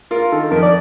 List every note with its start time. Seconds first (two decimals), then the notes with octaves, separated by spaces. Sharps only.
0.11 F4 A#4
0.32 D#3 A4
0.51 F2 A#4
0.62 D5